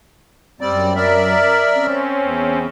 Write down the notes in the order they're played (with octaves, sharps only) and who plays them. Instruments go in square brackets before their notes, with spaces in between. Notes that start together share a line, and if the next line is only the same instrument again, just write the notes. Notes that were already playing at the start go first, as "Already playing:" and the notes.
[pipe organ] F#2 [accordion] G3 C4 D5
[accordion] A#4 D5 E5
[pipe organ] C4 C#4
[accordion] E2